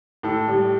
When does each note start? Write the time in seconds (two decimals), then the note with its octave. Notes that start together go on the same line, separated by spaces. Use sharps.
0.23 A2 A4
0.48 G3